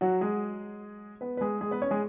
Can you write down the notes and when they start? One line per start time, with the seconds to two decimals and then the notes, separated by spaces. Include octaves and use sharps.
0.01 F#3 F#4
0.21 G#3 G#4
1.21 B3 B4
1.37 B4
1.41 G#3 G#4
1.61 G#3 G#4
1.71 B3 B4
1.82 C#4 C#5
1.91 G#3 G#4